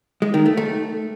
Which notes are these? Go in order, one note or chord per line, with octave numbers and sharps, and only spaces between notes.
G#3
D#3
A3
A3